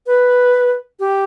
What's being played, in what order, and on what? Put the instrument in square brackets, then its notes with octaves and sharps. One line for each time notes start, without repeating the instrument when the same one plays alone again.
[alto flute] B4
G4